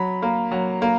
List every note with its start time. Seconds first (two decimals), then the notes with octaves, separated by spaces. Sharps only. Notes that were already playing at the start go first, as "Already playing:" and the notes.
Already playing: F#3 B5
0.22 A#3
0.51 F#3
0.82 A#3